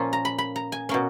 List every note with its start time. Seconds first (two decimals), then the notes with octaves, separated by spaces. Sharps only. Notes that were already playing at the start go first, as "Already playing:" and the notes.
Already playing: A#2 F3 A#3 C#4 F4
0.13 A#5
0.25 B5
0.38 B5
0.56 A#5
0.72 G#5
0.89 B2 A#3 C#4